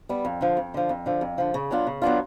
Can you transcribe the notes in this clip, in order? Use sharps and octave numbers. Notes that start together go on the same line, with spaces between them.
G3 B3
F2
D3 F3
F2
D3 F3
F2
D3 F3
F2
D3 F3
C#3
F#3 B3 D4 F4
C#3
F#3 B3 D4 F4